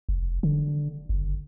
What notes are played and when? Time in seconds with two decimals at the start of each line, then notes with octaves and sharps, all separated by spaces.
0.09 F1
0.43 D3
1.09 F#1